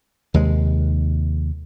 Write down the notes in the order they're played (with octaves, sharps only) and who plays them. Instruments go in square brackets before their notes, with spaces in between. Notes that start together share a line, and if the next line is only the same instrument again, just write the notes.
[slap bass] D#2 C3 G#3